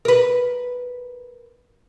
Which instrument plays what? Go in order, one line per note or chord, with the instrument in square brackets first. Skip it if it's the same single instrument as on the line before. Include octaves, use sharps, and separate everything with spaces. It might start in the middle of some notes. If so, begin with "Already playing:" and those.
[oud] A#4 B4